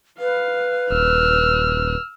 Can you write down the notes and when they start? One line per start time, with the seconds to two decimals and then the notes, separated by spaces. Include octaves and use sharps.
0.19 B4 F5
0.90 D#1 E6 F6